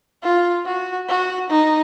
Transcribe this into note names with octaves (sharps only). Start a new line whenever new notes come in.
F4
F#4
F#4
D#4